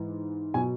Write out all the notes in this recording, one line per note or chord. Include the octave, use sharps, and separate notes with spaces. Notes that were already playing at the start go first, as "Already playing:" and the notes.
Already playing: G#2 E3
B2 F#3 G#5